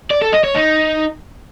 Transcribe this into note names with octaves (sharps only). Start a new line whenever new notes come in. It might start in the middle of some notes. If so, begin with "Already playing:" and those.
D5
A4
D#5
C#5
D#4